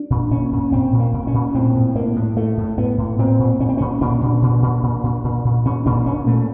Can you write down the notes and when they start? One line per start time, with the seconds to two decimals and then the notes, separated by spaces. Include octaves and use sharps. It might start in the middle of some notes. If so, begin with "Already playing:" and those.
Already playing: D4
0.10 A#2
0.31 A#2 C#4
0.52 A#2
0.72 A#2 C4
0.93 A#2
0.99 A#3
1.13 A#2
1.27 C#4
1.34 A#2
1.54 A2 C4
1.75 A2
1.95 A2 A#3
2.16 A2
2.36 A2 A3
2.57 A2
2.78 A2 B3
2.98 A2
3.19 A#2 C4
3.39 A#2
3.60 A#2 C#4
3.69 C4
3.77 A#2 C#4
4.01 A#2 D4
4.21 A#2
4.42 A#2
4.62 A#2
4.83 A#2
5.04 A#2
5.24 A#2
5.45 A#2
5.65 A#2 C#4
5.86 A#2 D4
6.06 A#2 C#4
6.27 A#2 A3